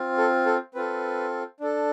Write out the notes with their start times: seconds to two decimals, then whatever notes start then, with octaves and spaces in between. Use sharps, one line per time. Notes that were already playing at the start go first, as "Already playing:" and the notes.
Already playing: C4 F4
0.18 A4
0.46 A4
0.75 C4 F4 A4 B4
1.60 D4 A4